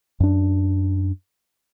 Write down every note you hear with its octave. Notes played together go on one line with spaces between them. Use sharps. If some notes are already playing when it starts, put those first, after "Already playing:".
F#2 D4